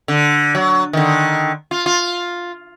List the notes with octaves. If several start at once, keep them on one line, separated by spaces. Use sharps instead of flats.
D3
F#3
D3 D#3
F4
F4